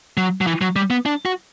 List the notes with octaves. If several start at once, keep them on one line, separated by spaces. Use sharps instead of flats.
F#3
F#3
E3
F#3
G3
B3
D4
F#4